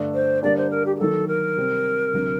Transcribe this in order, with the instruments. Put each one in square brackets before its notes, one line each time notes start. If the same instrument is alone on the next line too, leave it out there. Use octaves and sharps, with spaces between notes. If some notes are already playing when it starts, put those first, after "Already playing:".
Already playing: [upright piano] G2 D3 A3 D4
[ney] C5
[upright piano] D3 G3 A#3 D4 [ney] D5
[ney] C5
A#4
G4
G4
[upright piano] D#3 F#3 A#3 [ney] A4
[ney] A#4
[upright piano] C3 G3 C4
D2 C3 F#3